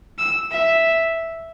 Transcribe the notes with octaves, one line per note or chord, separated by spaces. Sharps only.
E6
E5